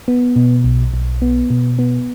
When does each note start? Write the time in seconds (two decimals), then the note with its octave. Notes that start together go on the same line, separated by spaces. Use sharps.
0.08 B3
0.36 B2
0.64 B1
0.93 B1
1.22 B3
1.50 B2
1.79 B3